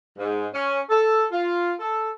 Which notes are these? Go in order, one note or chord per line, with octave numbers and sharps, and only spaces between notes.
G#2
C#4
A4
F4
A4